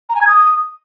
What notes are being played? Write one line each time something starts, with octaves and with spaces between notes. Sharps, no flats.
A#5
G#5
G#6
D#6